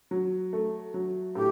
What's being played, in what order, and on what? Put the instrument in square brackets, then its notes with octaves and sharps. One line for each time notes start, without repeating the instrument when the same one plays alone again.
[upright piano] F#3
A3
F#3
[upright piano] A2 [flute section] G4